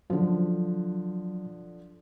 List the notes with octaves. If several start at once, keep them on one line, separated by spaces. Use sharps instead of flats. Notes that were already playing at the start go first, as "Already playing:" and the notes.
D3 F3 F#3